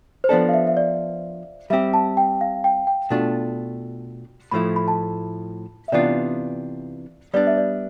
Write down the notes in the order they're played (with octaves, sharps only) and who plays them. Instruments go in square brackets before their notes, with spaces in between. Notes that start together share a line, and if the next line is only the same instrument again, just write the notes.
[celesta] C5
[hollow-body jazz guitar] F3 B3 D4 A4 [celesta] D5
[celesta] F5
E5
E5
D5
[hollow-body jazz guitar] G3 C4 G4 [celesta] E5
[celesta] A5
G5
F5
G5
G5
[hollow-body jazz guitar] B2 A3 D4 F4
[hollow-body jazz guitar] A2 F3 A3 E4 [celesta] B5
[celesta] B5
A5
E5
[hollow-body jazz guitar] C3 E3 B3 D4 F4 [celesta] D5
[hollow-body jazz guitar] G3 B3 D4 [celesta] D5
[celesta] E5
D5